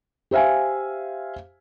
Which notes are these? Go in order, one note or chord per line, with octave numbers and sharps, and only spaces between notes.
G4 C5 E5 F5 G#5